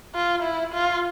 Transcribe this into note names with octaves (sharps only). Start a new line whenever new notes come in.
F4
E4
F4